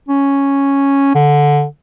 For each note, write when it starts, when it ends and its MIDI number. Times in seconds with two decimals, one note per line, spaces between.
0.09 1.10 61
1.15 1.64 50